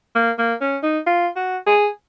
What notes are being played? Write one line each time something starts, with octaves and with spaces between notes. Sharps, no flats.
A#3
A#3
C#4
D#4
F4
F#4
G#4